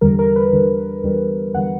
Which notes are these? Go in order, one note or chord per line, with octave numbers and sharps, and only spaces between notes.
E2 D3 G3 A#4
A#4
B4
E2 D3 G3
E2 D3 G3
E2 D3 G3 F#5